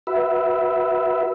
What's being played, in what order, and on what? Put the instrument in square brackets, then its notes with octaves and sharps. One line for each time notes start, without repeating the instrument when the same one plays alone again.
[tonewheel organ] F#4 B4 E5